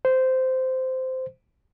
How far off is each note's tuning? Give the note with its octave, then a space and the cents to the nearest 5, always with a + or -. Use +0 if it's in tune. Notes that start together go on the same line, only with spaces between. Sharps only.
C5 -15